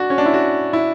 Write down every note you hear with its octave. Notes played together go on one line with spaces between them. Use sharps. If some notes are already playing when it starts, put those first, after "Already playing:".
Already playing: D4 F#4
C#4
D4
E4
F#4
E4